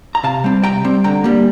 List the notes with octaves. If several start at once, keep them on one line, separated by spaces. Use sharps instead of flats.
A#5
C3 F5 A5
G3 C4
C3 G5 A#5
G3 C4
D3 G5 A#5
G3 A#3